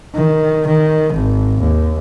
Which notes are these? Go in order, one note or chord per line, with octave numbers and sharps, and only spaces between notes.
D#3
D#3
G#1
D#2